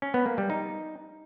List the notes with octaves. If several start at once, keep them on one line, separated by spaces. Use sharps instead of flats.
C#4
B3
A#3
G3
D#4